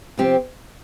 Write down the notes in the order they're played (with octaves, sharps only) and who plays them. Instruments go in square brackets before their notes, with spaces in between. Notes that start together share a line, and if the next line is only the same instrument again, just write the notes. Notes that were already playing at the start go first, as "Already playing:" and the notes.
[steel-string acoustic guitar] C3 F3 C4 G4